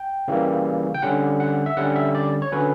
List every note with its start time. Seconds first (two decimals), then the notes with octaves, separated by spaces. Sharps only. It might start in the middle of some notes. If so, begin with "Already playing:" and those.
Already playing: G5
0.28 C#3 E3 G3 A#3
0.94 G5
1.02 D3 G3 C#4 F#5
1.40 F#5
1.66 E5
1.77 D3 G3 C#4 F#5
1.96 E5
2.15 D5
2.42 C#5
2.52 D3 F#3 C#4 B4